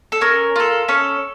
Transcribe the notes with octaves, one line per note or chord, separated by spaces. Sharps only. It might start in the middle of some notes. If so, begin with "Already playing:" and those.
A4
C#4 A#4
F4 A4
C#4 A4